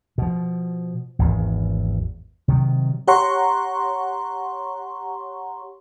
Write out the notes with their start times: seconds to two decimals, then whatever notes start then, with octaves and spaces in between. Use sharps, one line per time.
0.18 B2 F3
1.19 G#1 E2
2.48 C3 D#3 F#3
3.08 G4 C#5 F#5 A#5 C6 C#6